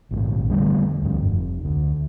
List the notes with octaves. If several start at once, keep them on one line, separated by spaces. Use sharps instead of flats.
A#1 G#2
F1 D3 G3 A3
D2 G2
F1
D2